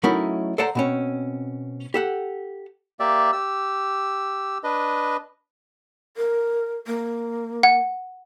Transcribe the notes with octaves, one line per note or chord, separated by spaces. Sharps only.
F#3 A3 C#4 D#4 E4 A#4
A4 C5 D5 F#5 A5 A#5
B2 C4 C#4
G4 A4 F#5
A#3 G4 D5 E5
G4 E6
D4 B4 D#5
A#4
A#3
F#5